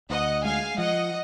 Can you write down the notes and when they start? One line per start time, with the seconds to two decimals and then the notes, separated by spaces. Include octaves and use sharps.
0.10 D2 D#5 F#5
0.44 G#3 F5 G#5
0.78 F3 D#5 F#5